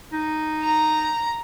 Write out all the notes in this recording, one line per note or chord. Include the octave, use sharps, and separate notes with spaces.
D#4
A#5